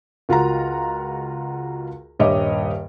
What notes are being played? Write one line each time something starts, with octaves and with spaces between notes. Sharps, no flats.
C#2 F4 F#4 A#4 A#5
D#1 G2 G4 C#5 D#5 E5